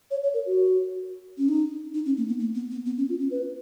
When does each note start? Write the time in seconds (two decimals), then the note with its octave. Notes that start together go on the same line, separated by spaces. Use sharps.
0.11 C#5
0.23 C#5
0.34 A#4
0.46 F#4
1.38 C#4
1.48 D#4
1.94 D#4
2.05 C#4
2.17 A#3
2.28 B3
2.39 A#3
2.55 B3
2.71 B3
2.86 B3
2.97 C#4
3.09 F4
3.19 C#4
3.31 B4